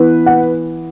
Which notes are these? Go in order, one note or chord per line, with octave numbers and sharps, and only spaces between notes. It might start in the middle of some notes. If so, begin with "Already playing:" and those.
Already playing: E3 B3 B4
F#5